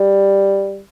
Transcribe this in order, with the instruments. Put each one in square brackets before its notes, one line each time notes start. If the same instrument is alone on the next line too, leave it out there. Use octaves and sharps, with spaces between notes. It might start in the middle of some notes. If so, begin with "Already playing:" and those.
Already playing: [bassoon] G3